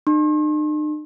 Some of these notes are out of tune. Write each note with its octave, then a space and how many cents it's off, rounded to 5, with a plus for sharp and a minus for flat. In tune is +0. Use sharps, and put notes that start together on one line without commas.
D#4 -45 C6 +45